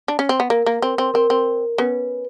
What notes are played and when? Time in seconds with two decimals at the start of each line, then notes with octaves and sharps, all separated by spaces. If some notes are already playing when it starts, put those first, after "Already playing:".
0.08 D4
0.19 C#4
0.29 C4
0.40 B3
0.50 A#3 A#4
0.66 A#3
0.82 C4
0.98 C4
1.14 C4 A#4
1.30 C4
1.78 B3 C#4 B4